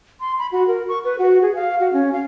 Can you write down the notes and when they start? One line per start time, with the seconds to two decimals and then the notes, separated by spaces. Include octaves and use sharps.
0.20 C6
0.39 B5
0.52 F#4
0.68 A#4
0.89 C#6
1.04 B4
1.19 F#4
1.42 G#4
1.55 F5
1.80 F#4
1.93 C#4
2.13 F5